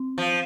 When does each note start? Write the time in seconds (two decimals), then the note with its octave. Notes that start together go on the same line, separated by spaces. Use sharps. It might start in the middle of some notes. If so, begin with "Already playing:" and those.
Already playing: C4
0.18 F3